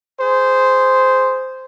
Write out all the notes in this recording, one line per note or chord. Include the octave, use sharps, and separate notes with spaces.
G#4 C5